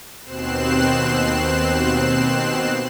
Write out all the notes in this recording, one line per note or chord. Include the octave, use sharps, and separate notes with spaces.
D#2 B2 C4 F#6 C7 E7